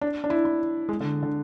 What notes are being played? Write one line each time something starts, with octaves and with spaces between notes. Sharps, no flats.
D4
D4
E4
E4
G#3
D3
D3